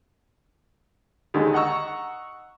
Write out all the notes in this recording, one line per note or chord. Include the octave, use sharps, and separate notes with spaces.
D#2 D3 D#3 G#3
D#5 F#5 A#5 C#6 E6